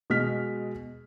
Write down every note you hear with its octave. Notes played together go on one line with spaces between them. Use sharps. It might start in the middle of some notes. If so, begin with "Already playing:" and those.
B2 G#3 D#5 F6 B6